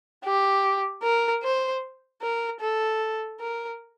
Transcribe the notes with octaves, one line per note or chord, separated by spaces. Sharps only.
G4
A#4
C5
A#4
A4
A#4